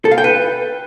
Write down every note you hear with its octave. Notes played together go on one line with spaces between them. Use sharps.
A4
F5
G5
B4